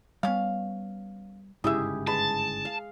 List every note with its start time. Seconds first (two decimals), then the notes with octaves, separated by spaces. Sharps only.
0.23 G3 B3 C#4 F5
1.64 G1 G#2 C#3 E4 G4 G#4 D#5 E5
2.07 G#3 B4 A5
2.65 F5